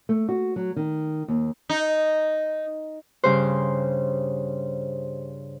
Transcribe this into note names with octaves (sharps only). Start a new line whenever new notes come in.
A3
F#4
F#3
D#3
D#2
D#4
G2 C#3 C5